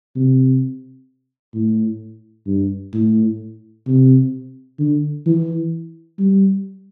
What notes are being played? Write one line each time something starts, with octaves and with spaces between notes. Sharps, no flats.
C3
A2
G2
A2
C3
D3
E3
G3